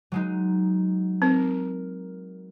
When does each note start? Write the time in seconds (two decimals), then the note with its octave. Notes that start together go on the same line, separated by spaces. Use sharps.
0.12 F#3 G#3 D#4
1.22 C4 A#4